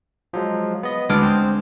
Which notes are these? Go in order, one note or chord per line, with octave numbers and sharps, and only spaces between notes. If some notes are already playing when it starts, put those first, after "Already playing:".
F3 F#3 G#3
B3 D#5
D2 G#3 B3 D4 D6 F6
C4 C5